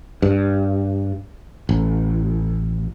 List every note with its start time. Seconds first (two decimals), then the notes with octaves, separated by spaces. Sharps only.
0.22 G2
1.69 A1